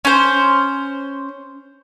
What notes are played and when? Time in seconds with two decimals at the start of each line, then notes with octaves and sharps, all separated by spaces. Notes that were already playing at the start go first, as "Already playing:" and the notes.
0.05 C#4 C5